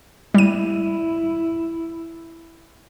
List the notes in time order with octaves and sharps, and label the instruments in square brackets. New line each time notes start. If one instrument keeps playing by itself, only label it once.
[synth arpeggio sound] G3 D#7 [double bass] E4